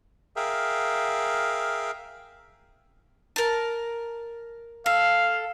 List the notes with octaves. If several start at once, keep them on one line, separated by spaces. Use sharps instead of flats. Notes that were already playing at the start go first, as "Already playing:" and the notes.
G#4 A#4 E5 F5 G5
A#4 A5
A4 F5